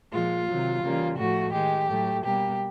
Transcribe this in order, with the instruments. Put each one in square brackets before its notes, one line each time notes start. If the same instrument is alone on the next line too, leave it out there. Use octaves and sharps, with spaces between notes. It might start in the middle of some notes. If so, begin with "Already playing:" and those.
[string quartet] A#2 F3 G#3 F4
C3 D#3 F#3
C#3 E3 G3 A#3
A2 F3 A3 F#4
D#3 G#3 G4
A2 F#3 A3
B2 G3 A#3 G4